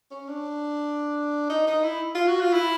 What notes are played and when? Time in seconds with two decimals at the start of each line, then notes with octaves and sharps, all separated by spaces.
0.11 C#4
0.28 D4
1.50 D#4
1.67 D#4
1.84 E4
2.15 F4
2.28 F#4
2.41 F4
2.53 E4